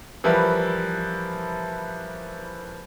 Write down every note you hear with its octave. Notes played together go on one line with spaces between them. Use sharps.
E3 F3 G3 E4 A#4 B4